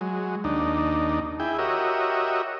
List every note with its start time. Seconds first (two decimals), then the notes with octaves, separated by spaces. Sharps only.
0.01 F#3 G#3
0.44 D#2 D4 D#4
1.40 E4 G#4 G5
1.59 F#4 G4 A#4 C#5 D#5 E5